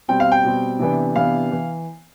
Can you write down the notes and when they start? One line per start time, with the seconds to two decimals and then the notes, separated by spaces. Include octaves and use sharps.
0.08 B2 G3 C4 G5
0.20 F5
0.32 G5
0.44 B2 G3 C4
0.79 C3 E3 B3 D4
1.16 C3 E3 B3 D4 F5
1.52 E3